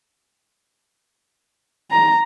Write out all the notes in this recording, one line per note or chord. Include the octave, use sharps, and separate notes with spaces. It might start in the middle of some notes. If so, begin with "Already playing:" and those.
A#5